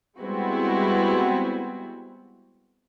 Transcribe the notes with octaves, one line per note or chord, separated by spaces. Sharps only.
G3 G#3 B3 C4 E4 F#4